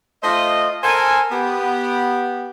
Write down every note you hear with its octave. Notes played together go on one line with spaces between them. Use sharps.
A3 F4 C5 D#5
A4 A#4 C5 G#5
B3 G4